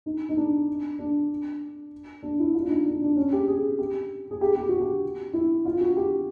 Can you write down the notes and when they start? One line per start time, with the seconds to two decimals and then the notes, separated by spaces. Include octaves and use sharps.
0.06 D#4
0.29 D#4
0.37 D4
0.99 D4
2.23 D4
2.39 E4
2.54 F4
2.63 D4
2.69 D#4
2.86 D4
3.01 D4
3.16 C#4
3.33 G4
3.48 G#4
3.79 G4
4.31 G#4
4.41 G4
4.56 G4
4.69 F#4
4.81 G4
5.33 E4
5.65 F4
5.81 F#4
5.97 G4